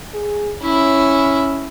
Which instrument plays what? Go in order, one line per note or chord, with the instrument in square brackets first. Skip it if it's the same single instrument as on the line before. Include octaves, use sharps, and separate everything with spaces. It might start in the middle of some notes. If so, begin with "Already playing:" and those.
[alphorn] G#4
[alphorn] C#4 [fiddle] E4